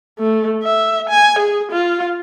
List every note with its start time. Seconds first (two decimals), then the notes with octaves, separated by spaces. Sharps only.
0.20 A3
0.63 E5
1.10 G#5
1.39 G#4
1.72 F4